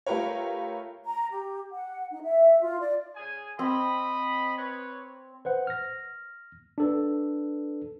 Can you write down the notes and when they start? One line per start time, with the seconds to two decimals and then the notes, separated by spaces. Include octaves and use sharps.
0.07 A3 F4 G4 A#4 B4 C#5
1.06 A#5
1.32 G4
1.72 F#5
2.11 D#4
2.24 E5
2.62 F4
2.80 D5
3.16 C#3 G#4 G#5
3.59 C4 D#5 B5
4.58 B4 C#5
5.45 B4 C5 F#5
5.67 F6 A#6
6.78 D4 A4 B4